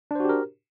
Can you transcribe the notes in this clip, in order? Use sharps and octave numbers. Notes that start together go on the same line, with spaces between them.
D4 F#4 G4 A#4 C5